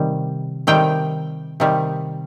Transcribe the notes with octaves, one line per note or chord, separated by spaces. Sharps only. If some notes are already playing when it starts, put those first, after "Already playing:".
Already playing: C3 D#3 G3
C3 D#3 G3 G5
C3 D#3 G3